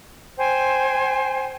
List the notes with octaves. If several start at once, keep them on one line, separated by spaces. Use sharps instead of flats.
C5 G5 G#5